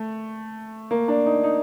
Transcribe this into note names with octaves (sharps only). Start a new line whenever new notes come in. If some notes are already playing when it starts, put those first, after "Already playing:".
Already playing: A3
A#3
D4
D#4
D#4